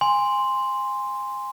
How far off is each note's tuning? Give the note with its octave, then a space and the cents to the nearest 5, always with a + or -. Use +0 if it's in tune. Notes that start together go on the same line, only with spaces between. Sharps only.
G#5 -20 C6 +0